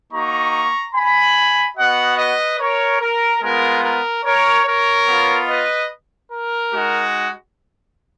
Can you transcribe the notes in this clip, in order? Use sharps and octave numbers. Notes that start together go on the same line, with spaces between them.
A#3 D#4 F#4 A#5 C#6
G#5 B5
B3 F#4 D#5 F#5
B4 D#5
A#4 C#5
A#4
G#3 B3 F4 A#4
A#4
A#4 C#5
A#4 C#5
B3 F4
B4 D#5
A#4
G#3 D#4 F#4